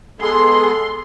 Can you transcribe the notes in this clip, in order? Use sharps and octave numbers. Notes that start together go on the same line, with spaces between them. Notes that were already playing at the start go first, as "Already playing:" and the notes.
G#3 B3 G#4 A4 C6